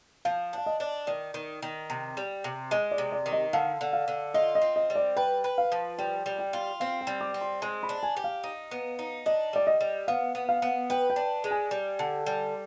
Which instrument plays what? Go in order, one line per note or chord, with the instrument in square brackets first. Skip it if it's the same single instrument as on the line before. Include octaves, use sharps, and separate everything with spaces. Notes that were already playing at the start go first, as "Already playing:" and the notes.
[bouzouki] F3 [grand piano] F5
[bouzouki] D4 [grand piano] F5
[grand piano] D#5
[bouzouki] D4
[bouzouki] D#3 [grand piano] D5
[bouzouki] D#3
D#3
C3
G3
C3
[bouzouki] G#3 [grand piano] D#5
[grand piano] D5
[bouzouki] C3
[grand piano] D5
[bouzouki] D#3
[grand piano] D#5
[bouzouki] D3 [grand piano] F5
[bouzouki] D3
[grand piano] F5
[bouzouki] D3
[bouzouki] F4 [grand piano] D#5
[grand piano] D#5
[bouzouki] C4
[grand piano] D#5
[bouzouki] G3
[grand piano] D5
[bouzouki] B4 [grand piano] G5
[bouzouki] B4
[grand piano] F5
[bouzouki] F3
[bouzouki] G3 [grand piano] G5
[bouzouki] G3
[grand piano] G5
[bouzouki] F4
[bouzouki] C4 [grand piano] F5
[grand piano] G5
[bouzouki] G3
[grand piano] D6
[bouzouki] C4
[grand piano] C6
[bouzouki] G#3 [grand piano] C6
[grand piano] B5
[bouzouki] D4
[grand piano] G#5
[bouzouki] G4
[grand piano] F5
[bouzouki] D#4
B3
D#4
[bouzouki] D4 [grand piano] D#5
[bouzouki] G3 [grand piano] D5
[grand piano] D#5
[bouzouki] G3
[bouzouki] B3 [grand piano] F5
[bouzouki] B3
[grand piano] F5
[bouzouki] B3
[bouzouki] B4 [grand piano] G5
[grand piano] G5
[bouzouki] D4
G#3
[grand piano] G#5
[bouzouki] G3
D3
G3